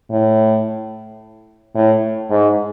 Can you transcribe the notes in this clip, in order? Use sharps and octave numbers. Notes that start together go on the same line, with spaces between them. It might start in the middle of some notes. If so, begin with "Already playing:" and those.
A2
A2
G#2